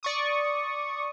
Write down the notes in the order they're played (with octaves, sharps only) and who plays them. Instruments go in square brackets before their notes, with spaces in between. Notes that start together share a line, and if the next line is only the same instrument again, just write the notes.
[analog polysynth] D5 C#6 D#6